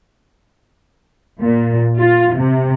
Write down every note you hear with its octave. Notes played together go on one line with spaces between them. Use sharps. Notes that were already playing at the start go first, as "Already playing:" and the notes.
A#2
F4
C3